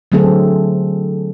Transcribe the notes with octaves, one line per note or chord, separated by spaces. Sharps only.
D3 F#3 A3 C4 G#4 A4